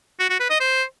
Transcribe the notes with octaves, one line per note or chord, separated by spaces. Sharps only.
F#4
F#4
B4
D#5
C5